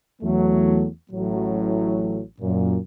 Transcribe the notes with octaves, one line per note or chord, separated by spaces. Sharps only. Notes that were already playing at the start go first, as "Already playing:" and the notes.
E2 F#3 A3
A1 A2 F#3
F#2 A#2